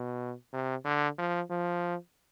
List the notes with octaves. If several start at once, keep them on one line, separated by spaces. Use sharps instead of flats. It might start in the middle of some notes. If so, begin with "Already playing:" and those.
Already playing: B2
C3
D3
F3
F3